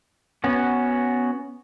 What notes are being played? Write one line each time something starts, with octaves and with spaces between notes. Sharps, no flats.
B3 C#4 F#4